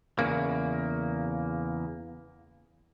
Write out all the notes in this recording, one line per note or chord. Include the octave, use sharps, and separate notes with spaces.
E2 C#3 A#3